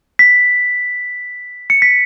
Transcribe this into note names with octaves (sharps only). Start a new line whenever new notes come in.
B6
C#7
B6